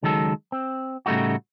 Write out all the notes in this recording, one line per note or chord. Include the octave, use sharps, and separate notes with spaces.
C#2 D#3 F#3 G#3 A4
C4
A2 C#3 G3 A3 D#4 F#4